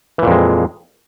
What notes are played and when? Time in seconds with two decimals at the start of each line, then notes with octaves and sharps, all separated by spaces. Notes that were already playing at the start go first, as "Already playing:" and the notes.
0.18 E3
0.22 A#2
0.27 F2
0.31 G#3